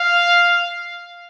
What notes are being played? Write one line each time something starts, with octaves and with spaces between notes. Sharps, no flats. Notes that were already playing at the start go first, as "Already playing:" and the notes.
Already playing: F5